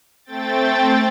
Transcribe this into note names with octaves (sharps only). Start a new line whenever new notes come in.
A3 C4 G5 A6